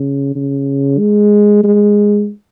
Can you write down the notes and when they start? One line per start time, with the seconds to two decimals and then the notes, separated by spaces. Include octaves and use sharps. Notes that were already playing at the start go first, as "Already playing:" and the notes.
Already playing: C#3
0.35 C#3
0.99 G#3
1.64 G#3